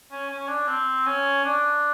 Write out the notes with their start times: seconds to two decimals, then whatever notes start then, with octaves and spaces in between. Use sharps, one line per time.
0.11 C#4
0.30 C#4
0.48 D4
0.67 C4
1.06 C#4
1.44 D4